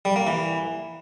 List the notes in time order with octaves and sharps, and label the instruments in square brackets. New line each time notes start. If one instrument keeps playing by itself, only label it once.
[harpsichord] G3
A#3
E3